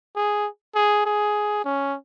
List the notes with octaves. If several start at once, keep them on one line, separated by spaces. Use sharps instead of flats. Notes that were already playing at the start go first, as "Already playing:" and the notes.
G#4
G#4
G#4
C#4